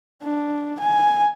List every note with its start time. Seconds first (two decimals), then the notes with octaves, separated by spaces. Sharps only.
0.23 D4
0.80 G#5